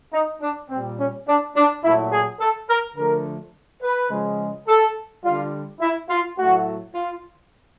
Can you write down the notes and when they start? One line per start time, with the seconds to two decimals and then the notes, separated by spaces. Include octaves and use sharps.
0.12 D#4
0.41 D4
0.69 A#2 G3 C4
0.98 C#4
1.26 D4
1.55 D4
1.83 A#2 F#3 A3 E4
2.12 G#4
2.39 A4
2.69 A#4
2.96 D3 F3 A3 A#4
3.82 B4
4.10 C#3 F3 G#3
4.67 A4
5.23 D3 G3 F4
5.80 E4
6.09 F4
6.38 A2 F#3 A3 F#4
6.94 F4